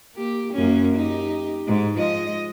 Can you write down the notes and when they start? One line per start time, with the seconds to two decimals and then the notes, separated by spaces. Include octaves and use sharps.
0.15 A#3 G4
0.53 F#2 A#3 C#4
0.96 D#4 G4
1.67 G#2 G#3
1.98 F3 G#3 D#5